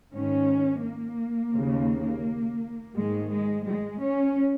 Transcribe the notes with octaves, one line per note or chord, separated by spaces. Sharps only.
G#2 D#3 C#4
A#3
D#2 C#3
G#2 D#3 G#3
G#3
G#3
C#4